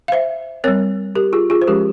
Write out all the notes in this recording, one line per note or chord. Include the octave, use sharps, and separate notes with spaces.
F5
C5 E5
G3 C4 A#4 C#5
G4 A#4
F4 G#4
F4 G#4
C5
F3 G#3 C#4 G4 A#4